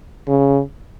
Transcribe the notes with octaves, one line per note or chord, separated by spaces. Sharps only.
C#3